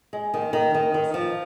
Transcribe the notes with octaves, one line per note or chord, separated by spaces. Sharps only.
G#3
D#3
D#3
D#3
D#3
F3